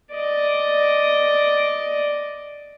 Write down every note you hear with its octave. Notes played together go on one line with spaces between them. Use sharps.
D5 D#5